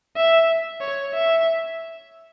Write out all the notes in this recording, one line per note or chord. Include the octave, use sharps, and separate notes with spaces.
E5
C#5
E5